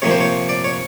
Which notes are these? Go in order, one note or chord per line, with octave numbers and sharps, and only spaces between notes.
C3 F3 A#3 C#5
C5
C#5
D5
C#5